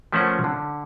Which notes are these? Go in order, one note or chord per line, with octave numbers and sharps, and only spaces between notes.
F3 A3 C#4 A#4 C5 F#5
D3